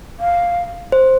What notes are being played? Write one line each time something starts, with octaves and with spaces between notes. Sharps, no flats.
F5
C5